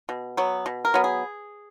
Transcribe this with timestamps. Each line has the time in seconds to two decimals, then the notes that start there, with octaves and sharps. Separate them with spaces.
0.09 B2
0.37 F#3 B3
0.66 B2
0.85 A#4
0.94 F#3 B3
1.04 G#4